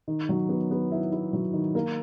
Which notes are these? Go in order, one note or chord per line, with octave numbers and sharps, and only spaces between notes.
D#3
F#3
B3
B3
E4
E4
F#3
D#3
A#3